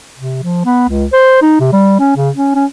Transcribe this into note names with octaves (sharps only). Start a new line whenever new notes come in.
C3
F3
B3
C#2
C5
D#4
C3
G3
C#4
C#3
C#4
C#4